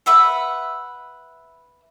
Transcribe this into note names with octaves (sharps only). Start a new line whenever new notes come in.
B4 E5 F#5